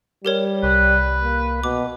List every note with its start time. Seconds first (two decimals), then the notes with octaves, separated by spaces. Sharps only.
0.25 G3 G4 A#4 C#5
0.63 C2 B4
1.24 A#3
1.64 B2 D6